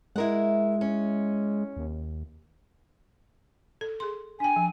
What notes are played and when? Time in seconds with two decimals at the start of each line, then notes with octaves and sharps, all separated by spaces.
0.16 G#3 E4 A#4 F#5
0.81 C#4
1.77 D#2
3.81 A4
4.00 G#4 C6
4.40 D4 G5 G#5
4.56 F3